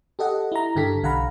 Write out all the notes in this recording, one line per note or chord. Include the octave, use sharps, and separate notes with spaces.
G4 A4 D#5 F#5
E4 A#5
G2 D3 G4 A4 B6
B1 D3 F5 F#5 A#5 B5